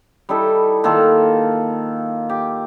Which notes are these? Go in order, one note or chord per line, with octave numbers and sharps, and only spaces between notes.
G3 D#4 E4 A4
D#3 A#3 F4 A4
G4